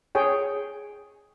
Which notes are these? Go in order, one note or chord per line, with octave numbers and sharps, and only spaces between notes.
G#4 C#5 G5